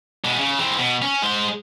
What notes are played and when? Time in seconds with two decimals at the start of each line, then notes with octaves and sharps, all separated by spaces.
0.25 B2 G#3
0.38 C#3
0.59 E3 C4
0.78 B2
1.02 C#4
1.23 G#3 C5